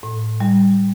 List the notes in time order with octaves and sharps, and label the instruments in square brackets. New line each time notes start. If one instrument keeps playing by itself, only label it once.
[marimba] A2
G3